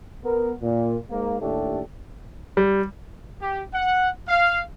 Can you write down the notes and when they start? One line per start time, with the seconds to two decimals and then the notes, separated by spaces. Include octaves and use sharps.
0.24 B3 A#4
0.63 A#2
1.10 G#2 A#3
1.41 D#2 A2 A3 D4 G4 A4
2.57 G3
3.42 G4
3.74 F#5
4.28 F5